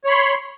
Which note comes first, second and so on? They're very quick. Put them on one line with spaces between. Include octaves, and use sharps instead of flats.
C#5 B5 C6